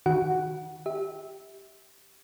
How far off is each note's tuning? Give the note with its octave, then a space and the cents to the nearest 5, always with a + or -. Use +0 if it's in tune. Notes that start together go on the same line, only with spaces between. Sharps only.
D#3 +0 F#4 +0 F#5 +5
G4 +0 E5 -25